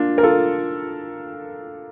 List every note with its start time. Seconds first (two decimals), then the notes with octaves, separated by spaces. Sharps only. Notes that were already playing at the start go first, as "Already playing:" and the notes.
Already playing: A#3 D4 F4
0.18 A#4
0.23 F4 A4